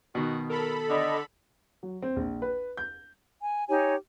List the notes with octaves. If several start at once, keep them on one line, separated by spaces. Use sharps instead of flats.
B2 D#3 F#4
A4 A#4 B5
D3 D5 D#5
F#3
C4
A#1
B4
G6
G#5
D#4 G4 C#5 G#5